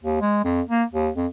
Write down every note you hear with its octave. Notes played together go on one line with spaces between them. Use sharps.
D#2
G#3
F2
A#3
D#2
F2